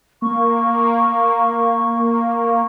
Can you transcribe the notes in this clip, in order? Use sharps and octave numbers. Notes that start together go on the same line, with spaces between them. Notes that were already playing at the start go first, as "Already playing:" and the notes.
A#3 C#6